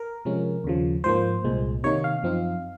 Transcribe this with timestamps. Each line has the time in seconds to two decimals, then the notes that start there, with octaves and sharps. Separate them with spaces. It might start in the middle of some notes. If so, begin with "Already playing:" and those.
Already playing: A#4
0.25 C3 F3 G#3 C#4
0.64 D#2 C#3 F3
1.04 G#2 F3 A#3 C5
1.44 C2 A#2 G#3
1.84 C3 D#3 A#3 D#4 C#5
2.04 F5
2.23 F#2 F3 C4 D#4